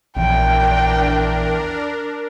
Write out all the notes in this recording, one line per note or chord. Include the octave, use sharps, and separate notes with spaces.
A#1 E2 D4 A#4 G5